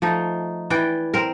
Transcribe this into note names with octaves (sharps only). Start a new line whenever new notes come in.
F3 A3 D#4
E3 B4 D5 G5
C4 A#4